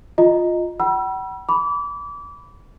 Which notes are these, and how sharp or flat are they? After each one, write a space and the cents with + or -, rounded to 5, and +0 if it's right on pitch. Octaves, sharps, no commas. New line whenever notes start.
F4 +10 D#5 +0 A#5 +0
F#5 +45 B5 -35 E6 +30
B5 +0 D6 -30